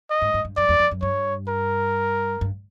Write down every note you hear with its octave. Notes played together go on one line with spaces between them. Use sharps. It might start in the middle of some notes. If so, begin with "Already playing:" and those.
D#5
G#2
G#2
G2
F#2 D5
E2
F2
F#2
G2 C#5
A#4
G2